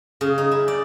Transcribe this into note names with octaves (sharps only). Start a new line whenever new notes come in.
C#3
D#4
E4
D5